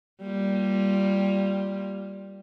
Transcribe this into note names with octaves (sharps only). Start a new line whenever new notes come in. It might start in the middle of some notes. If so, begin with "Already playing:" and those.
G3 A#3 F4